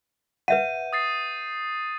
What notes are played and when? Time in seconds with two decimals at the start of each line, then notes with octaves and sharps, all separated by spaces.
0.48 B4 E5 F#5 G6 D#7
0.93 D#6 A6 C7